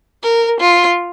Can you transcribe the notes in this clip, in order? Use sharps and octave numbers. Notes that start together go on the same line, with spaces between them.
A#4
F4